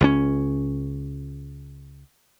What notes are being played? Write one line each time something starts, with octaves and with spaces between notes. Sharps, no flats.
C#2 F#3 C#4